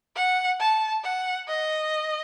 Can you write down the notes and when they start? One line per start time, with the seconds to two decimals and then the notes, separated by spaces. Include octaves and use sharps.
0.16 F#5
0.60 A5
1.04 F#5
1.48 D#5